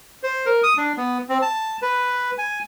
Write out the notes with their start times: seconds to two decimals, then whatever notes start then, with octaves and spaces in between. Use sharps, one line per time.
0.23 C5
0.46 A#4
0.63 D#6
0.77 D4
0.97 B3
1.29 C4
1.42 A5
1.82 B4
2.38 G#5